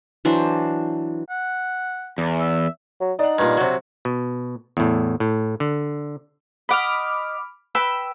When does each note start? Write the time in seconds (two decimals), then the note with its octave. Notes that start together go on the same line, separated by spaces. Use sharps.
0.25 E3 F#3 D4 C5
1.30 F#5
2.18 E2
2.40 E5
3.00 F#3
3.19 D4 D#4 F#5
3.39 G2 A#2
3.57 C3 F#3
4.05 B2
4.77 E2 A2
5.20 A2
5.60 D3
6.69 D#5 F#5 B5 D6 F6
7.75 B4 G5 B5 E6